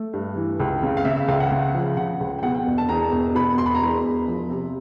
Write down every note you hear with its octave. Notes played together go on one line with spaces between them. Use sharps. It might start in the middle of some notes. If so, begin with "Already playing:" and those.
Already playing: A3
G2
E3
C#2
C#3
F5
C#3 E5
E5
C#2 F5
F#5
C#3
F3
C#3 F#5
C#2
G5
B2 F#5
G5
E1
A5
E2 A#5
E1
B2 B5
E1 C6
B5
A#5
E2 B5
E1
F3
C3